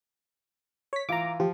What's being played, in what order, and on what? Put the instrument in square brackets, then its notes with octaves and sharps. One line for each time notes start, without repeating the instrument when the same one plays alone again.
[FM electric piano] C#5 B6
[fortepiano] E3 F4 [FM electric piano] A#5 D6
[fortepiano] F3 [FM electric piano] G4